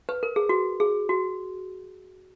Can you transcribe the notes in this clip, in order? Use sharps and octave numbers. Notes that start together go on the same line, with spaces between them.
B4
A#4
G#4
F#4
G#4
F#4